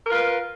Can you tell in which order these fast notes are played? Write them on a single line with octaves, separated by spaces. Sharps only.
A#4 B4 F4